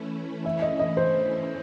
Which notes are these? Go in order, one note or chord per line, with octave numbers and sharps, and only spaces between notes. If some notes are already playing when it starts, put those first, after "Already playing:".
Already playing: E3 A3 C#4 E4
E5
D#5
D#5
C5